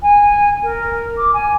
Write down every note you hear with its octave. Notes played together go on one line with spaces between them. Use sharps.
G#5
A#4
D6
G#5